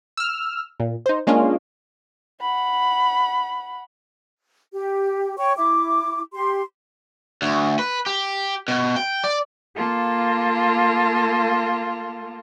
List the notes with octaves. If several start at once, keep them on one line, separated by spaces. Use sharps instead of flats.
E6 F6
A#2
D#4 C5
G#3 A#3 C#4 D4 F4
F#5 B5
G4
C#5 G5 C#6
E4 D6
G4 C6
D2
B4
G4
B2
G5
D5
A#3 F4 A4